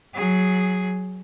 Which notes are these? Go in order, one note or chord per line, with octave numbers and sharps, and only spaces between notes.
F#3 G#4